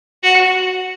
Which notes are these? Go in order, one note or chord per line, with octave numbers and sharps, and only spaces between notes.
F#4